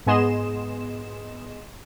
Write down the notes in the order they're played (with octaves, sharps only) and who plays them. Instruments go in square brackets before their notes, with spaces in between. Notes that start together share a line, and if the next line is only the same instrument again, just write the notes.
[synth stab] G#2 B3 G#4 D#5 C6 E7